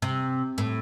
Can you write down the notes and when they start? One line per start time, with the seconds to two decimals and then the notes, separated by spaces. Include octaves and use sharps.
0.02 C3
0.58 A2